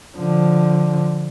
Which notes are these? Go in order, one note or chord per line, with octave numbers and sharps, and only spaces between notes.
D3 F3